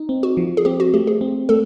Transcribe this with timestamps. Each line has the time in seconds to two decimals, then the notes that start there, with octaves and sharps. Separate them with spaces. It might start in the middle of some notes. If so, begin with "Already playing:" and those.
Already playing: D#4
0.09 C4
0.23 F#4
0.37 F3
0.57 G#4
0.65 C4 G4
0.80 F#4
0.94 A3 G4
1.07 G#4
1.21 C4
1.49 A3 A4